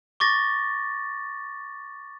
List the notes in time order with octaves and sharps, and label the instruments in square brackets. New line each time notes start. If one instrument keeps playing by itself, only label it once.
[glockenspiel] C#6 D6 A6 A#6